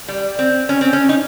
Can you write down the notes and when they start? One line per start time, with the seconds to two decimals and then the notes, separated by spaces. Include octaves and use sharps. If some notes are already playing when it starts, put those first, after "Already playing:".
0.08 G3
0.39 C4
0.69 C#4
0.81 C4
0.93 C#4
1.09 D#4